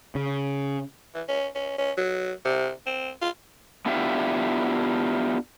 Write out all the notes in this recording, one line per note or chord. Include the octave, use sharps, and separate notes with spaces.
C#3
E3
C#4
C#4
C#4
F#3
C3
C4
F4
B3 D4 E4 F4 G4 E5